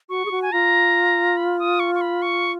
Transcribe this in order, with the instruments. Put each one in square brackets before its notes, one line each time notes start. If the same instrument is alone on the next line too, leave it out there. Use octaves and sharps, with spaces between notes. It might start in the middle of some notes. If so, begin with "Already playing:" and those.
[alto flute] F#4 [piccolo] C#6
[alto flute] G#4
F#4
[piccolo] G#5
[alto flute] F4 [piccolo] A#5
[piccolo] B5
D#6
C#6
C#6
B5
C#6